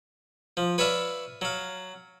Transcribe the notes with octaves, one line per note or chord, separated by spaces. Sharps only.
F3
B4 C#5 D5 E5 F5 A5
F#3 F5